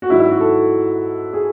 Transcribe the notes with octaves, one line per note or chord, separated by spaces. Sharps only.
F#4
G#2 D#3 F#3 E4
E4
F#4
A4
G#4